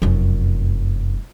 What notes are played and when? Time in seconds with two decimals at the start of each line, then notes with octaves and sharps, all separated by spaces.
0.02 F1 F#2